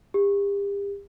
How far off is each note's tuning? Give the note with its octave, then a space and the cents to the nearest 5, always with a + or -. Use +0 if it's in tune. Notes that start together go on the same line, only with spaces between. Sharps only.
G4 +40